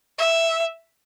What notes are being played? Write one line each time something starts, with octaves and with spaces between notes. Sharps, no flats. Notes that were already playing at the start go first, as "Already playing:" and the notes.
E5